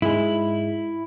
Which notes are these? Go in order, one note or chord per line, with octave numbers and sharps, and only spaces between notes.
G#2 G#3 E4